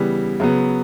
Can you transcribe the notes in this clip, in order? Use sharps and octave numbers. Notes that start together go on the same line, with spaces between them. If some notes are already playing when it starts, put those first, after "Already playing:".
Already playing: C#3 E3 G3 B3
C#3 F#3 B3